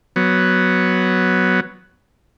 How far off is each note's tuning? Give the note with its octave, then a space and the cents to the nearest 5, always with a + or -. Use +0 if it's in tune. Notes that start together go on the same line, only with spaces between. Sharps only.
F#3 +0 B3 +0